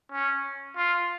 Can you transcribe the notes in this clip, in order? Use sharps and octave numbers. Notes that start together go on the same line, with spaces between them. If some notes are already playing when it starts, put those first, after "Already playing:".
C#4
F4